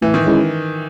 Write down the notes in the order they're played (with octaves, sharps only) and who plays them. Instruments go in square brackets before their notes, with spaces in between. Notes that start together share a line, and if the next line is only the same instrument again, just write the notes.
[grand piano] A2 [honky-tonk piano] E3
[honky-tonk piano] D#3
[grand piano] G#3 C#4 E4